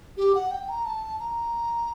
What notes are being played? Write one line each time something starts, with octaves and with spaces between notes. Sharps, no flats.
G4
F#5
G5
A#5
A5
A#5